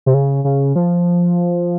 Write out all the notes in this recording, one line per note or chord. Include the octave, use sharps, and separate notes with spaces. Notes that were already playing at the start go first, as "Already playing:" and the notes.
C3
C#3
C#3
F3